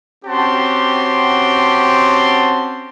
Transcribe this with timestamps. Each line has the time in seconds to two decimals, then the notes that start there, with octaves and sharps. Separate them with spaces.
0.25 C4 C#4 F#4 G4 A5 C6